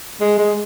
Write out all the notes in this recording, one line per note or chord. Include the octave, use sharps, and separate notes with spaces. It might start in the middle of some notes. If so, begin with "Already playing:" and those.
G#3
G#3